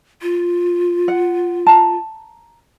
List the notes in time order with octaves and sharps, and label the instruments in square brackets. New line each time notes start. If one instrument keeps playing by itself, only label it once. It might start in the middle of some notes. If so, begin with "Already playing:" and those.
[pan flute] F4
[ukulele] F#5
A5 A#5